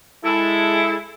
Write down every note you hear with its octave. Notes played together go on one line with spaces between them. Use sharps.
G#3 E4 A4